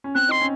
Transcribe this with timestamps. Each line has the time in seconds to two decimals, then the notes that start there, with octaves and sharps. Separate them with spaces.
0.04 C#4
0.15 C4 F#6
0.29 D#4 C6
0.41 C#4